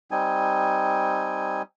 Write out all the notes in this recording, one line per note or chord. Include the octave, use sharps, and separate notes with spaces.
G3 C4 D#4 G#5